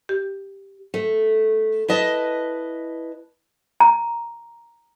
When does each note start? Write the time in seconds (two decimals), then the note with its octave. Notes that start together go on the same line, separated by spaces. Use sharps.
0.09 G4
0.94 A3
1.88 E4 B4 D#5 A5
3.80 A#5